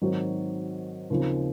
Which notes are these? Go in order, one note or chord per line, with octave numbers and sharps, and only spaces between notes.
G#2 D#3 F#3 C4
D#2 C#3 F3 C4